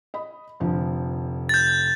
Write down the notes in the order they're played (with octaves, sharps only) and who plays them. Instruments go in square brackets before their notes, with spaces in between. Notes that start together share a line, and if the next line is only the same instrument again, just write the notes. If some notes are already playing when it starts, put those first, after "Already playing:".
[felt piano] D#5 B5
F1 D3 F3
[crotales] G6 A6